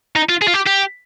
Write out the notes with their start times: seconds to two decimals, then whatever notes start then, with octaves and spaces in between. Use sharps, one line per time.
0.16 D#4
0.29 F4
0.42 G#4
0.48 F4
0.54 G4
0.67 G4